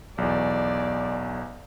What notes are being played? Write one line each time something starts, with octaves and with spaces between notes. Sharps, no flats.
B1 E2 D5